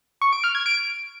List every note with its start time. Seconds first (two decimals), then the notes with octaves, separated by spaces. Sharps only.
0.22 C#6
0.33 D7
0.44 F6
0.55 G#6
0.66 D7